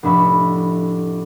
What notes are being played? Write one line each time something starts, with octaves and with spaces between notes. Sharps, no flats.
F1 A2 D4 E5 B5 C#6